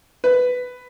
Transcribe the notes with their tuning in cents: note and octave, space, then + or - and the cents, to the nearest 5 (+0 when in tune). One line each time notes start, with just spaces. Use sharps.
B4 +10